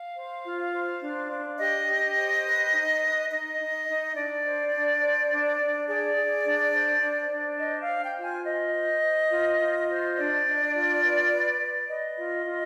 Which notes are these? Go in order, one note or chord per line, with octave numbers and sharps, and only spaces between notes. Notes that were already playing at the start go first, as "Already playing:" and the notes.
Already playing: F5
C5
F4
C5
D4
D4
G4 D#5
G4
C5
B4
D#4
B4
D#4 D#5
D#4
D#4
D4 D5
C5
D4
C5
D4
D4
G#4 D5
G#4
D4
C5
D4
D4
C5 D#5
F5
C5
G5
F4
G#5
C5 D#5
C5
C5
F4
F4
C5
D4 D5
D4
F4
B4
B4
B4
B4 D#5
F4
F4